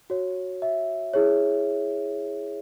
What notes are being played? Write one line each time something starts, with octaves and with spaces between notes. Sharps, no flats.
F#4 C#5
E5
E4 G#4 C#5